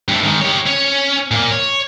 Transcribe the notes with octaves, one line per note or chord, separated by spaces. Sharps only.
G2 A3
D#3 G#3
G4 C#5
C#4
A#2 A#3
C#5